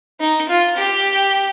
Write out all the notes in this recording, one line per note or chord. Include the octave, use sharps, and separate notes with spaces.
D#4
F4
G4